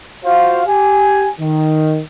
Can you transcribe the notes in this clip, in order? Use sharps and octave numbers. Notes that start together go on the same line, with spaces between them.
F4 F#4 C5 F5
G4 G#5
D#3